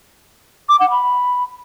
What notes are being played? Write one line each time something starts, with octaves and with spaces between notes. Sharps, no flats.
D6
F#5
B5